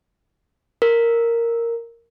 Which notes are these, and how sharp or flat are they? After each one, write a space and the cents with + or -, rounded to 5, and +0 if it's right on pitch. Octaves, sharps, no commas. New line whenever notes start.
A#4 -5